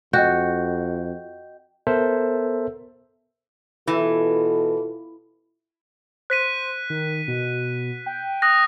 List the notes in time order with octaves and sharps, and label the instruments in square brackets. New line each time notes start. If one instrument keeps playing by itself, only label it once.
[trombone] F2 [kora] F#4 [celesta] D#5 G5 G6
[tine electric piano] B3 A4 A#4 C5 E5
[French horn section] B2 F4 A4 [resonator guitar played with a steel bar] E3
[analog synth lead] C5 [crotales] F#6 B6 D#7
[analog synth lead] D#3
B2
G5
[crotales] D#6 F#6 A#6